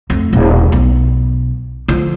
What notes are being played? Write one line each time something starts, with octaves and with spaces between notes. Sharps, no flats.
F2 A3
D#1
B1
D3 F3